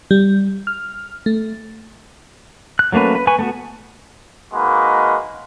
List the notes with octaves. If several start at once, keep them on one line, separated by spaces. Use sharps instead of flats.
G3
F6
A3
F#6
F#3 A3 A#3 C#4 B4
B4
B4 G#5 C#6
A3 B3 F#4
G#3 A#3 D#4 F#4 B4